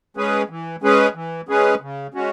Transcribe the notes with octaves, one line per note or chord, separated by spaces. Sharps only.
G#3 C#4 G#4 B4
E3
G#3 C#4 G#4 B4
E3
G#3 C#4 G#4 B4
C#3
G#3 C#4 F#4